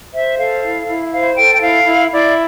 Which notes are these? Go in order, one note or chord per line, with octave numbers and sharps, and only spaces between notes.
C5 E5
A4 F5
E4
E4
C5 F5
A4 G5
G5
E4 F5
E4
E4 D5